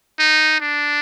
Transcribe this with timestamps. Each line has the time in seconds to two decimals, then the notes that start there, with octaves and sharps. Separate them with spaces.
0.19 D#4
0.60 D4